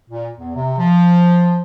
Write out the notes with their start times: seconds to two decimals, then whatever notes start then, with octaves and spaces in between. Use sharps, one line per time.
0.10 A#2
0.37 E2
0.55 C3
0.77 F3